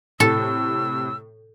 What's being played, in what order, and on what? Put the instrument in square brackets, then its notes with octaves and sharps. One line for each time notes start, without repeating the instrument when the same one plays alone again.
[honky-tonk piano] A2 C3 [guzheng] A4 [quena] E6